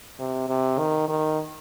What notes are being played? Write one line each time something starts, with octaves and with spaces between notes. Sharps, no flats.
C3
C3
D#3
D#3